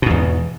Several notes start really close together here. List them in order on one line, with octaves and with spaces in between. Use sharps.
B2 G#2 E2